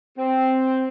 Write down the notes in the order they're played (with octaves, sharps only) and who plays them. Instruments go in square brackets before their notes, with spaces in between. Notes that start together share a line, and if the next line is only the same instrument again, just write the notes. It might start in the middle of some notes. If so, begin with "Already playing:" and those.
[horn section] C4